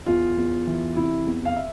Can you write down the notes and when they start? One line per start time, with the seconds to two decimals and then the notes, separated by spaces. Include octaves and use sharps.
0.06 E2 F4
0.38 E2
0.67 E3
0.96 C3 E4
1.27 E2
1.45 F5
1.56 E5